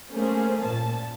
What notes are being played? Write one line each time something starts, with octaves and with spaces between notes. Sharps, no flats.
A3 A#3 C#4 G#4 C5
A#2 A5